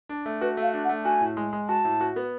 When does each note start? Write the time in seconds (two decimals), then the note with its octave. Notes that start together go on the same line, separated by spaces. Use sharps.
0.09 D4
0.26 A3
0.41 F#4 B4
0.57 A3
0.62 F5
0.74 D4
0.85 F#5
0.89 A3
1.05 F#4 G#5
1.21 A2
1.37 G#3
1.53 G#3
1.68 F#4 A5
1.85 A2
2.01 F#4
2.16 B3